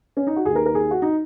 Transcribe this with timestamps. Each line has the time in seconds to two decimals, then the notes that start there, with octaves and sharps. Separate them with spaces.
0.17 C#4
0.27 D#4
0.36 F#4
0.45 D#2 D#3 G#4
0.55 A#4
0.66 A#4
0.75 G#4
0.91 F#4
1.02 D#4